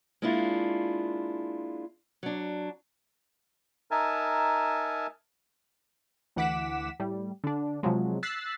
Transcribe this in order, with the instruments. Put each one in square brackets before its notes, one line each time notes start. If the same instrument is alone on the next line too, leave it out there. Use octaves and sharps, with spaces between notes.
[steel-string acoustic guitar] G#3 A#3 D4 E4 F4
F#3 D4
[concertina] D#4 A#4 E5 G#5 A5
[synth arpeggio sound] D2 E3 F#5 D6 B6 E7
A2 G3
D3 D4
C3 F3 F#3 G#3
E6 F#6 A6 B6 C7